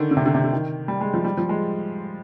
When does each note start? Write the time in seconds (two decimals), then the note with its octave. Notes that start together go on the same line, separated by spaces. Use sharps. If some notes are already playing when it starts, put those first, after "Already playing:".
Already playing: D3 D#3
0.11 D3
0.17 C3
0.26 D3
0.35 C3
0.44 D3
0.53 D#3
0.88 G3
1.01 G#3
1.14 F3
1.24 G3
1.37 F3
1.49 G#3